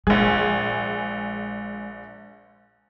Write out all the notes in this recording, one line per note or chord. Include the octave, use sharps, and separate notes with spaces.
A#1 G#3 G#4